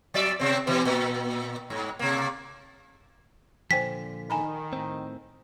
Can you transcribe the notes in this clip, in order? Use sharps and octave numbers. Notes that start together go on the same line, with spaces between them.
F#3 D5 E5
C3 C4
B2 E3
A#2
G#2
C3 A#3
A#2 D3 F3 C5 G5 G#5 B6
D#3 G#5 A#5 B5
A2 C4